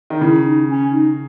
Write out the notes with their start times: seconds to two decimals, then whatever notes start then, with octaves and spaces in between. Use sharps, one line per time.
0.10 D#3
0.21 C#3 E4
0.45 D#4
0.68 C#4
0.92 D#4